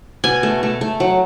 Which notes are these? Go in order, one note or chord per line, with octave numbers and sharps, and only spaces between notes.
B2 G#5
A3
A3
A3
F#3